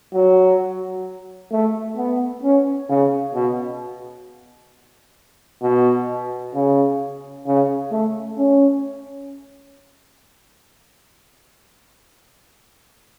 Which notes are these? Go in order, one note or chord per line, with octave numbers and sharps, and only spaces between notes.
F#3
A3
B3
C#4
C#3
B2
B2
C#3
C#3
A3
C#4